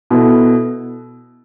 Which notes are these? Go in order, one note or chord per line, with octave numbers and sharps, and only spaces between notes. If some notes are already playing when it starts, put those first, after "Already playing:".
B2 B3 E4 A4